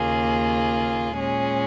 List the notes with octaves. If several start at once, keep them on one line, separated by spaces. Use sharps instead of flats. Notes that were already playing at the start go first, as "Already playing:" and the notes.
Already playing: D#2 C#3 A#3 F4 G#4
A#2 G#3 C#4 G#4